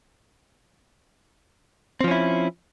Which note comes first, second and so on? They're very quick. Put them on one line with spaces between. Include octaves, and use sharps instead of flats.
C4 F3 C#4 E4